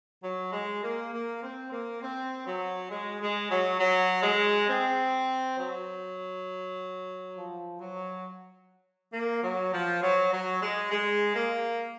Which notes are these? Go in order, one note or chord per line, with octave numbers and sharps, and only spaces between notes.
F#3
G#3
A#3
A#3
C4
A#3
C4
F#3
G#3
G#3
F#3
F#3
G#3
C4
F#3
F3
F#3
A#3
F#3
F3
F#3
F#3
G#3
G#3
A#3